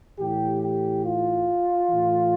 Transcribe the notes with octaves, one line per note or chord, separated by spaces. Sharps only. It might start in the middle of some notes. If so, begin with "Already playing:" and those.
A2 E3 G4
G4
F4
A2 E3